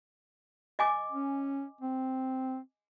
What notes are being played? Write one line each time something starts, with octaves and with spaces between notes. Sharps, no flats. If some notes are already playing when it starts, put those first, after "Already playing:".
D#5 G#5 D6
C#4
C4